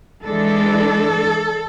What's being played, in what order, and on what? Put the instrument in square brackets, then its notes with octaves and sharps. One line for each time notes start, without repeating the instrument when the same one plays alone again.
[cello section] E3 G#3 D4 A4